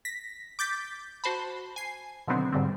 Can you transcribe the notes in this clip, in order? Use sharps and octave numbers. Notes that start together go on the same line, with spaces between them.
A#6 B6
D6 G6 A6 B6
F#4 C5 A5 B5
G#5 C7
B2 D3 D#3 F#3 B3 C4
G#2 D3 G3 C4